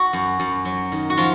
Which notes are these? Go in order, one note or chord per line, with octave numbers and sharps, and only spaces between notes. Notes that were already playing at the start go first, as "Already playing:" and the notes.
Already playing: F#4
F#2
F#2
F#3
D#3
F#4
F3 F4